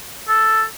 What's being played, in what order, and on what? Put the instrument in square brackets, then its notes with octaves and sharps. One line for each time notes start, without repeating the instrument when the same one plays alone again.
[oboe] A4